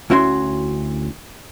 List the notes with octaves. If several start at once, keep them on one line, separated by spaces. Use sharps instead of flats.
D2 C#4 E4 F#4 C#5 C6